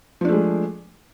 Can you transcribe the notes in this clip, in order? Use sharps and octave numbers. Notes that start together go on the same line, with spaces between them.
F3 G#3 A3 D4